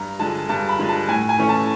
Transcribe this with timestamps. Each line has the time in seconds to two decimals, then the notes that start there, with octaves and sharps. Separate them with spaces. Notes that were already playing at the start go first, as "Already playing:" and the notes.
Already playing: G2 A#5
0.19 D3 F3 G#3 A5
0.49 G2 A5
0.69 B5
0.79 D3 F3 G#3
0.89 A5
1.09 A2 G#5
1.29 G#5
1.38 E3 A3 C#4
1.49 A5